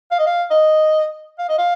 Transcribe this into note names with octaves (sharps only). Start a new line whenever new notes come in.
F5
D#5
F5
D#5
F5
D#5
F5